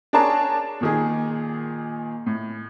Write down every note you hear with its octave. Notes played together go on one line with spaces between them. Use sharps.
D4 G#4 A#4 C#5 A5
A#2 D#3 G#4
A2